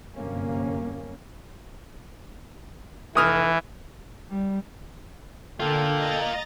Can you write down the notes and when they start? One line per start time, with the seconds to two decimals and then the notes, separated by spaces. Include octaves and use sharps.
0.16 G1 F#2 C3 A#3 C#4
3.15 F1 E3 D#6 F6
4.30 G3
5.60 D3 A#3 F4 A4 G5
5.97 D#5 A#5 A6